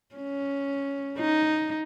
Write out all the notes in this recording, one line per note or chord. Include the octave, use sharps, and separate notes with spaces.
C#4
D#4